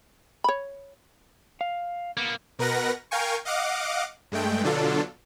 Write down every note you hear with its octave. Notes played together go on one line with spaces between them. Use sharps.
C#5 B5
F5
A#3 B3
B2 A#4 B4 F#5 A#6
A#4 F5 G5 G#5 C#6
D#5 F5 F#5 D6
G2 G#3 A3 G5
B2 D3 F#3 D4 F4 A4